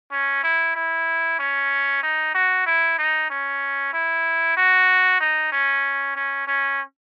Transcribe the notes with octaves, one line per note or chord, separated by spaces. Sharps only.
C#4
E4
E4
C#4
D#4
F#4
E4
D#4
C#4
E4
F#4
D#4
C#4
C#4
C#4